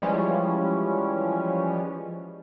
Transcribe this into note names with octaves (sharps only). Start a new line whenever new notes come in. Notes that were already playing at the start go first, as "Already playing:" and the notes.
E3 F3 G3 G#3 C#4